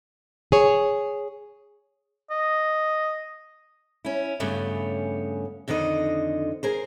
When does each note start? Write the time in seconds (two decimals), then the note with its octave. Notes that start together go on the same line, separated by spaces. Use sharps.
0.52 G#4 C#5
2.31 D#5
4.05 C#4 E4
4.40 G2 C#3 G3 A3 B3 C#4
5.68 F2 D3 D#3 C5 D#5
6.63 G#4 A#4 C5